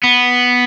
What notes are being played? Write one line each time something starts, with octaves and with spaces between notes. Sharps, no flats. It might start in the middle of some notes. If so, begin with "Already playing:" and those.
B3